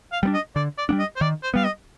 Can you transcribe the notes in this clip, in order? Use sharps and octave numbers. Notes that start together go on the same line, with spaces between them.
F5
G3 B3 D4
D#5
D3 D5
D5
G3 B3 D4
D#5
C5
D#3 D5
C5
G3 B3 F5
D#5